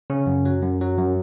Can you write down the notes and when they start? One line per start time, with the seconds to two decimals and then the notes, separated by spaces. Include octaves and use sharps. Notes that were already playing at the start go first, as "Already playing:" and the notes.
0.10 C#3 C#4
0.27 F#2
0.45 F#3
0.62 F#2
0.81 F#3
0.98 F#2